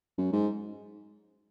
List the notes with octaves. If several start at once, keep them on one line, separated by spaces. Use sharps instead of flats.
F#2
G#2